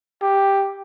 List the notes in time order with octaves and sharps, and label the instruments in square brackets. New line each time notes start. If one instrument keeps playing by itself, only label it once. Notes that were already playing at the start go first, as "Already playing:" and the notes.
[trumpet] G4